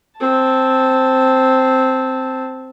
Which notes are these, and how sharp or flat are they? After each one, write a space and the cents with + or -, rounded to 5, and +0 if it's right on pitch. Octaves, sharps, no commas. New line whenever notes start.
C4 +0 A5 +0